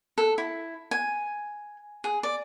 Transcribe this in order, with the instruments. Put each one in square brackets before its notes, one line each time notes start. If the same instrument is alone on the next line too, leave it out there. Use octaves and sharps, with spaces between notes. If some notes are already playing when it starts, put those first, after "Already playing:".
[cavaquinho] A4
E4
G#5
G#4
D5